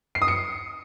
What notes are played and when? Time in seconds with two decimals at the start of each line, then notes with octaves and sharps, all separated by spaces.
0.15 C7
0.22 D#6
0.28 C#7